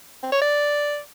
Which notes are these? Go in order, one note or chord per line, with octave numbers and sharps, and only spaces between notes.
C4
C#5
D5